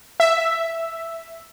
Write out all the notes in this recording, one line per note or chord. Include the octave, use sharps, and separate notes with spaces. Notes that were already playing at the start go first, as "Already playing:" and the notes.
E5